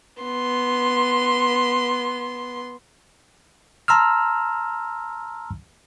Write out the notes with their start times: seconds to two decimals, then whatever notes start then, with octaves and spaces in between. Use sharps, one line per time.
0.23 B3 C6
3.88 A5 A#5 C6 E6 F6